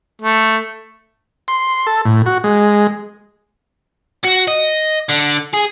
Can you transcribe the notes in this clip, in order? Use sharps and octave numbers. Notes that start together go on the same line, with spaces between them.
A3
C6
A4
A2
F#4
G#3
F#4
D#5
D3
G#4